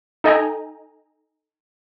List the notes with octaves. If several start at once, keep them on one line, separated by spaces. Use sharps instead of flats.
D#4 A4 D#5 G5 G#5 A#5